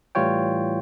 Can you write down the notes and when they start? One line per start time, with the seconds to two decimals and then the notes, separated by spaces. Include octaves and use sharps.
0.15 A2 E3 G3 F4 C#5 G5